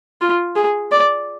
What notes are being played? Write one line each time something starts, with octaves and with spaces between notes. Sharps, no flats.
F4
G#4
D5